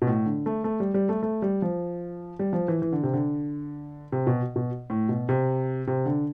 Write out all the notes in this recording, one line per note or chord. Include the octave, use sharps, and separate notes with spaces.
B2
A2
D3
A3
A3
G3
G3
A3
A3
G3
F3
G3
F3
E3
E3
D3
C3
D3
C3
B2
B2
A2
B2
C3
C3
D3